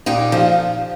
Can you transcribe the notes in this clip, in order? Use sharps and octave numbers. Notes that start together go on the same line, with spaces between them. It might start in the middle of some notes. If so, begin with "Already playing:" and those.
A#2 D#4 G4
F3